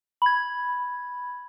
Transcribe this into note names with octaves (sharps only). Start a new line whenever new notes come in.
B5 G#6